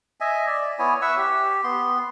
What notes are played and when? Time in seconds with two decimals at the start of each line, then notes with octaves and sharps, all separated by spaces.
0.20 D#5 E5 G#5
0.47 D5
0.79 B3 E4 C#5 G#5
1.02 E5 F#5 C#6 E6
1.17 G4
1.64 B3 C6